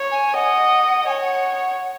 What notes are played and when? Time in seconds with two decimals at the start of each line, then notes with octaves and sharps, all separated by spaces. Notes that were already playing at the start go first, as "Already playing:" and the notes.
Already playing: C#5
0.11 G#5
0.35 D#5 F#5
1.06 C#5 F#5 G#5
1.79 F#5